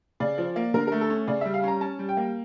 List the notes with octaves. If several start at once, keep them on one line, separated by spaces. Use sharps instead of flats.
C#3 D5
F3
A#3
D3 A#4
A3 A#4
A4
C#4
C#3 D5
G3 E5
F5
C#4 A#5
C#4 A5
G3
G5
A#3